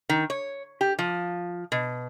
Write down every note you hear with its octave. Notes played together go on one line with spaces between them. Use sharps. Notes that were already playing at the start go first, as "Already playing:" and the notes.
D#3
C#5
G4
F3
B2